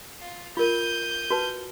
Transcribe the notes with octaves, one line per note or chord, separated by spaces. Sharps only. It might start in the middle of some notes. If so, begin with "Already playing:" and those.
F4
F4 A#4 G6 D#7
F#4 B4 A5